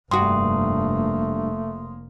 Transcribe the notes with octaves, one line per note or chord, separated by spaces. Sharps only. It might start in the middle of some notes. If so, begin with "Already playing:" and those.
F1 G2 A3 A#3 F#4 C6 D#6